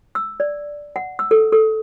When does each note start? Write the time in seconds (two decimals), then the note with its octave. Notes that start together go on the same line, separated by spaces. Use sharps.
0.15 E6
0.40 D5
0.96 F#5
1.19 E6
1.31 A4
1.52 A4